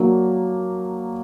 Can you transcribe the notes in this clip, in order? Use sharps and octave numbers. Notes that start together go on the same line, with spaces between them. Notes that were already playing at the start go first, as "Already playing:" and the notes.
Already playing: F#3 A#3 D4